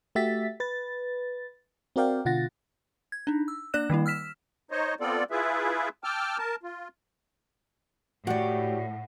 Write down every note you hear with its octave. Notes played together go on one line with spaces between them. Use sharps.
A3 F#4 G4 E5 A6 B6
B4 A6
C4 F#4 A#4 D5 F5 G5
B2 D3 F4 F#5 A6 A#6
G#6
D4 D#4
E6
A#3 D4 D5 F#6 E7
D#3 G3 A#3 E4
E6 F6 B6 E7
D#4 C5 C#5 D#5
B3 C4 F4 A4 D5
E4 F4 G#4 B4 E5
G5 A5 D6 E6 F6
A#4 A5
F4
A2 F#4 G4 C#5 D5 F#5